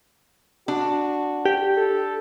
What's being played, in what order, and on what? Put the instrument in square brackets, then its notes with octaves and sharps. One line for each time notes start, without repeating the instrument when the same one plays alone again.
[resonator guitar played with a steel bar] D4 [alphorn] F#4
[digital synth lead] G4
[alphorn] A4